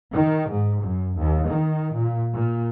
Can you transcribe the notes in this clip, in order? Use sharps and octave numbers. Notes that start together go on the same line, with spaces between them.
D#3
G#2
F#2
D#2
D#3
A#2
A#2